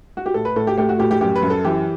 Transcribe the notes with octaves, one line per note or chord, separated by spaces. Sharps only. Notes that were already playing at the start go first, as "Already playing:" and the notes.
F#4
G4
A2 A4
B4
A2 A4
G4
A3 G4
F#4
A2 G4
G4
F#2 G4
B4
F#2
A4
E3 G4